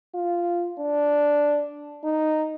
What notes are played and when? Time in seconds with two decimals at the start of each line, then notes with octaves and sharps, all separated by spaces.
0.15 F4
0.79 D4
2.04 D#4